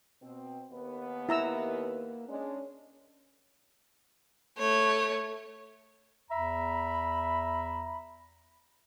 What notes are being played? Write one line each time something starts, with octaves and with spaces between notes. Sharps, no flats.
B2 C4
D#2 B3 B4
A#3 E4 A#5 E6
G#3 C#4 D4
A3 C#5
E2 E5 A#5 B5